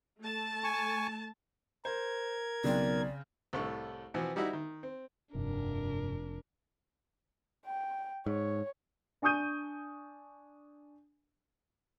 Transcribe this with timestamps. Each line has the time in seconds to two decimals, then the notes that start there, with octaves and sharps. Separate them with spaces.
0.20 A3 A5
0.64 G#5 C#6
1.85 A#4 C5 G#6
2.64 B1 C#3 C4 D5 G5
3.53 C2 A2 A3 C#6
4.14 B2 E3 F3 B3 C4
4.36 G3 D#4 E4 F#4 E5
4.53 D#3
4.83 C4
5.35 F1 G2 C3 D4 A#4
7.66 G5
8.26 G#2 C#5
9.22 D4 G#5 C#6 D#6 G6 D#7